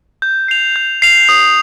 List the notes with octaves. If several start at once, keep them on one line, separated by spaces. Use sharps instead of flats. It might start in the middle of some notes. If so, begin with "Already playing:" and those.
G6
C7 F7
G6
C7 F7
D#6